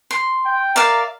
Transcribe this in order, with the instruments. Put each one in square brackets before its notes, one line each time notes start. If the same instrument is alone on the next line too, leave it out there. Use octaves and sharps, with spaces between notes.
[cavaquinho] C6
[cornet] G5
[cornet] A#4 [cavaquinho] D5 E5 F5